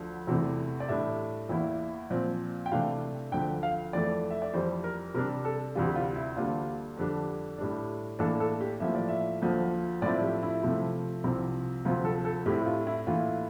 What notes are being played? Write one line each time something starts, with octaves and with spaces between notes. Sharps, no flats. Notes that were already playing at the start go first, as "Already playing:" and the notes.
Already playing: D2 D3 F3
E2 C3 E3 A3
D5
A2 G3 D4 E5
E2 E3 A#3 E4
A#2 F3 C4
G5
C3 E3 A3 D4 F5
D2 D3 F3 G5
F5
F2 E3 A3 D5
E5
D5
F2 E3 G3 C5
A#4
C3 G3 D4 A#4
A4
D2 C3 E3 G3 F4
G4
F4
E4
D2 D3 G3 A#3 D4 F4
F2 D3 G3 D4
A2 G3 D4
A2 E3 A#3 D4 A4
A4
G4
A2 F3 A#3 E5
D5
E5
D2 D3 F3 A#3
A2 F3 C4 E4 D5
G4
E4
C3 F3 A3
C2 C3 F3
D2 C3 F3 F4
A4
A4
A2 G3 C4 E4 G4
F4
E4
A2 E3 A#3 E4 F4